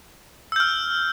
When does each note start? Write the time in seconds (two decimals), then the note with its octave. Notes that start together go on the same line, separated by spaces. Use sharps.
0.52 E6
0.56 G6
0.60 F6